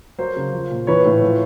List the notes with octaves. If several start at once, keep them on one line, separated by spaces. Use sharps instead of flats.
F#3 A#4 C5
C#3
F3
A#2
E3 B4 C#5
A2
F3